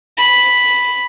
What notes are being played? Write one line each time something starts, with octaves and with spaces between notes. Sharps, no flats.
B5